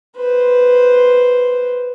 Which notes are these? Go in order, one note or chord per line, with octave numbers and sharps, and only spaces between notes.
B4 C5